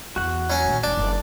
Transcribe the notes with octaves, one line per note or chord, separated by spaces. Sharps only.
E2 F#4 F#5
F#3 C#4
A#1 D#3
E1 D4 D5
F#1